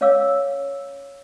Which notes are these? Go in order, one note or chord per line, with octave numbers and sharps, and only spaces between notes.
C#4 C#5 F5 D6 E6